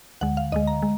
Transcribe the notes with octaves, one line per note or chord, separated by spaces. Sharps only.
D2 D3 G#3 F#5
F5
D2 D3 G#3 D#5
A#5
G#3